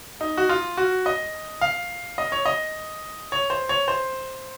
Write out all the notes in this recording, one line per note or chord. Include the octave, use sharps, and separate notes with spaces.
D#4
F#4
F4
F#4
D#5
F5
D#5
C#5
D#5
C#5
C5
C#5
C5